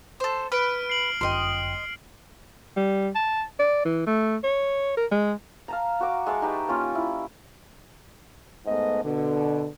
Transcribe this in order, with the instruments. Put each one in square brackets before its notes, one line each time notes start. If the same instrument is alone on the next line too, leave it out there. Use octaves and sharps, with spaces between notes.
[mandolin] A4 C5
[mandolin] B4 [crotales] F6 D7
[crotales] C7 F#7
[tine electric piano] G1 F#2 G5 [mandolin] D#5 C6
[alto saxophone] G3
A5
D5
E3
A3
C#5
A#4
G#3
[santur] F5 A5 A#5
F#4 A#5 D6
G#3 E5 A5 C#6
D#4 G4 B4 A5
A#3 C#4 F4
E4
[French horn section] G#2 A3 B3 A4 D#5
B2 D3